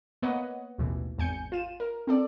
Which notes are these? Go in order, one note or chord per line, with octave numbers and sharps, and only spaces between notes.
A#3 B3 B4 C#5 D#5 F#5
A1 D#2 B2 E3
G#1 E2 G#5 G6 C#7
F4 D#7 E7
A#4
C4 A4 D5